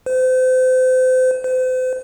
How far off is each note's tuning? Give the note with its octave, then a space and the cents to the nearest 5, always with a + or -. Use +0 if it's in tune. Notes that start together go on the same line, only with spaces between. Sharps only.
C5 -35
C5 -40